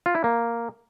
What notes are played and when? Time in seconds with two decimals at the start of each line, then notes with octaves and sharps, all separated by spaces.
0.06 F4
0.15 E4
0.24 A#3